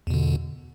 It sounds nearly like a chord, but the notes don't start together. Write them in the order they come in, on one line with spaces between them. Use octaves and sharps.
E2 B2 D3